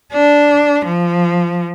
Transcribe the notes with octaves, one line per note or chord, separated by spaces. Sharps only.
D4
F3